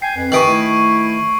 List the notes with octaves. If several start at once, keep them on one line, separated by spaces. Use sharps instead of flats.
G5 G#5 C7
F2 B4
C3 D#3 E3 B4 C#6 D#6 D7 F#7
A3 E4